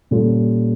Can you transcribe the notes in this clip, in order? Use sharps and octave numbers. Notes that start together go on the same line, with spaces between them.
A#2 G3 C#4 F4 A4